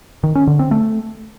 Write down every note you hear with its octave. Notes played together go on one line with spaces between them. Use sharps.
D#3
C#4
D3
C4
A3